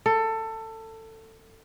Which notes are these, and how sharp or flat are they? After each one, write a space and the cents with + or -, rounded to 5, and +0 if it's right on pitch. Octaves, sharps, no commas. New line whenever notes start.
A4 +20